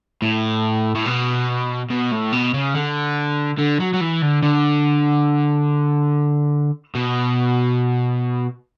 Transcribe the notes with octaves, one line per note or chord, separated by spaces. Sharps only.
A2
A2
B2
B2
A2
B2
C#3
D3
D3
F#3
F#3
E3
D3
D3
B2